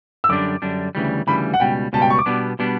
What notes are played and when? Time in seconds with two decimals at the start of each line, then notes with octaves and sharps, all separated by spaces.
0.24 E6
0.29 F#2 D3 G3 D4 D6
0.62 F#2 D3 G3 D4
0.95 D2 C#3 E3 G3
1.27 D2 C#3 E3 G3 B5
1.54 F#5
1.60 C#2 B2 G3 G5
1.93 C#2 B2 G3 A5
2.02 G5
2.10 C#6
2.19 D6
2.26 B2 G3 B3 D4
2.59 B2 G3 B3 D4